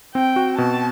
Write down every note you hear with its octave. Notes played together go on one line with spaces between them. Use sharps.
C4 G5
F#4
B2 A5